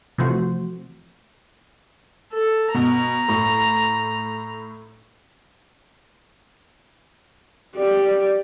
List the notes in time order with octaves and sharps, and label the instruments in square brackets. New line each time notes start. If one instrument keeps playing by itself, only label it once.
[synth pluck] C3 E3 F3 A3 F#4 C5
[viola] A4
[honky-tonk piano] B2 [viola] A#5
[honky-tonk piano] A2
[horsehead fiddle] G4 D5